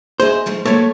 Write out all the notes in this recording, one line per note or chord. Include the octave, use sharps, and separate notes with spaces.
G#4 C5 D#5 E5
G#2 F3 A3
F#3 A3 A#3 C#5